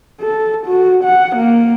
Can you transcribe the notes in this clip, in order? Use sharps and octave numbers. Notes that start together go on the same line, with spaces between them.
A4
F#4
F#5
A#3